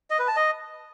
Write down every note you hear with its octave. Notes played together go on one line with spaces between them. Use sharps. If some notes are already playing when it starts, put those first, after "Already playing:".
D#5
B4
A5
D#5